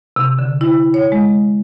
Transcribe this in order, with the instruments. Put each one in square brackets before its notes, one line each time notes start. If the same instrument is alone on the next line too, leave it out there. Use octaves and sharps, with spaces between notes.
[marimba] C3
D3
E4
C#5
G#3